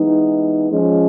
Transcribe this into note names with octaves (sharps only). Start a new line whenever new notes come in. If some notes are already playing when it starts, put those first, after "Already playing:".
Already playing: E3 G#3 B3 D#4
F3 G#3 C#4